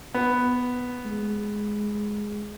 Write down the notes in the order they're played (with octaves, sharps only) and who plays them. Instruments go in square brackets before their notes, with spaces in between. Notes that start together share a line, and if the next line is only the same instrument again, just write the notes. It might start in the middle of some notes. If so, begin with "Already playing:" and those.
[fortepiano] B3
[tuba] G#3